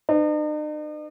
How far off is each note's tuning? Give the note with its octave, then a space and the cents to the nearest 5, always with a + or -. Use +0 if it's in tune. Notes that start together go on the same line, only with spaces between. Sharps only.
D#4 -45 B4 +35